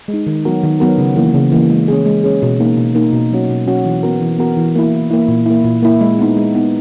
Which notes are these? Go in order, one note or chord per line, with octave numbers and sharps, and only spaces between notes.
G#3
D#4
D#3
F#3 B3 F#4 A#4
D#3
F#3 B3 F#4 A#4
C#3
E3 A#3
C#3
E3 A#3
G#3
C#4 G#4
G#3
C#4 G#4
B2
A#3 D#4
B2
A#3 D#4
B2
F#3 C#4 F#4
B2
F#3 C#4 F#4
E3
B3 F#4 A#4
E3
B3 F#4 A#4
E3
A#3 E4
E3
A#3 E4
A#2
A#3 E4
A#2
A#3 E4
G#3
B3 D#4
G#3
B3 D#4